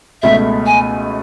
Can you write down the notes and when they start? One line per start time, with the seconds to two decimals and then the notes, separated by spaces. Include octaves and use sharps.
0.22 C#2 B2 A3 E5
0.66 G#5